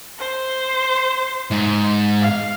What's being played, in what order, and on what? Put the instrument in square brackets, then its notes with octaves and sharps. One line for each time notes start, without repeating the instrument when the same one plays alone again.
[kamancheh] C5
[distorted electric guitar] G#2
[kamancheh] F5